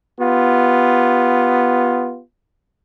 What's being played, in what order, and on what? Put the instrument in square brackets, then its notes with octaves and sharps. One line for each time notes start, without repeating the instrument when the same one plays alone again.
[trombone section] B3 F4 G4